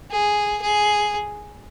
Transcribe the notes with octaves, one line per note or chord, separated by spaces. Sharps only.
G#4
G#4